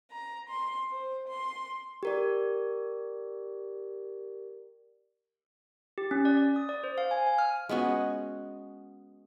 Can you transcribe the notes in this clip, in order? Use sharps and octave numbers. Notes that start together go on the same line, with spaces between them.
A#5
C6
C5
C6
G4 A#4 D5
G4
C#4
D5
D5
D#6
D5
C5
F5
G#5
G#5
F6
G#3 B3 C#4 F#4